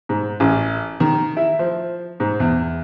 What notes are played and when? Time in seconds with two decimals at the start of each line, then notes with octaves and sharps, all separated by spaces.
0.09 G#2
0.40 A1
1.00 D#3
1.37 E4
1.59 F3
2.20 G#2
2.40 E2